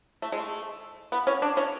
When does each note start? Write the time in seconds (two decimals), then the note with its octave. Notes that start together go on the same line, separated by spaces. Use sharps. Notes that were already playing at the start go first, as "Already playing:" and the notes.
0.22 A3
0.32 G#3
0.37 A3
1.12 B3
1.27 C#4
1.42 D4
1.57 C#4